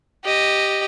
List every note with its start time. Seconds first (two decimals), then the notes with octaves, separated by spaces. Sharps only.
0.25 G4 D#5